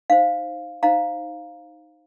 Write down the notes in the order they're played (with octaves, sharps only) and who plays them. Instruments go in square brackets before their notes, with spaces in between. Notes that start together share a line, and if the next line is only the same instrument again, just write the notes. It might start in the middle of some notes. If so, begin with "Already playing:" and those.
[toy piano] D#4 C5 F5
D#4 C5 F5 A#5